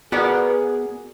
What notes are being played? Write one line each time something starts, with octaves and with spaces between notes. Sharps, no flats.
B3 F#4 G#4 A#4 D5